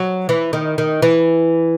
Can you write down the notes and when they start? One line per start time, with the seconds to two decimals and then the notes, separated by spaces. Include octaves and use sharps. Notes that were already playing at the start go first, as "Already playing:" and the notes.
Already playing: F#3
0.29 E3
0.53 D#3
0.78 D#3
1.02 E3